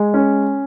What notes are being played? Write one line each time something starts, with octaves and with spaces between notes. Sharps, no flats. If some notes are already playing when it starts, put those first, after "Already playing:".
Already playing: G#3
C#4